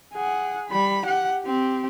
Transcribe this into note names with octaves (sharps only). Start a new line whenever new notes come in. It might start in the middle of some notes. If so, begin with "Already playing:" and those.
G#4 F#5
G3 B5
G4 F#5
C4 G4